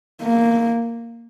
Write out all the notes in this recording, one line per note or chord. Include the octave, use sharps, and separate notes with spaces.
A#3